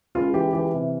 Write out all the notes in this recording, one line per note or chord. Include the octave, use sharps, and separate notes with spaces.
C#2 F4
E3 G4
E3 G4
C3